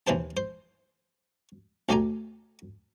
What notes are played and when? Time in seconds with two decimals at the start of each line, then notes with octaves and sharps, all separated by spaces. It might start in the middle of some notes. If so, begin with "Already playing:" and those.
0.07 D#2 E3 B4 C5 A5
0.37 C5
1.89 D2 A3 G4 D5 G#5 A#5